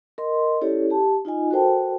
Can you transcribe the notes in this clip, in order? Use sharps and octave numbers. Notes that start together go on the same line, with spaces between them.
A#4 D#5 C6
C#4 E4 G4 A4 C#5 D5
G4 A5
D#4 F4 D#5 G#5
F#4 A4 A#4 C5 G5 A5